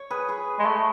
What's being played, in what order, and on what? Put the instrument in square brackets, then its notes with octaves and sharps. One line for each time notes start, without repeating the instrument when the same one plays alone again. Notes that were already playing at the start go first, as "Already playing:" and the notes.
Already playing: [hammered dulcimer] C#5
G#4 B4
G#4 B4
[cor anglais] G#3
A3